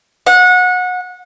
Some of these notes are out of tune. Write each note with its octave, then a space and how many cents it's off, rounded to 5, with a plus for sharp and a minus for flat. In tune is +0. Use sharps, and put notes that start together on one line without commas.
F#5 -25